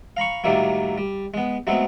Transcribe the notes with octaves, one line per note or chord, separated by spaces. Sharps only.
F5 A#5 B5 C#6
A2 D#3 F#3 G3 A3 A#3
G3
G#3 B3
F#3 G#3 A3 B3 C4